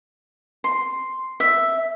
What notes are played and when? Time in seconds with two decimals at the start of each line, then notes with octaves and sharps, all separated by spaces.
0.64 C6
1.40 E5